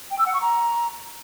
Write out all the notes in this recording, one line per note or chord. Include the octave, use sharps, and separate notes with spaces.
G5
E6
F#5
C#6
A#5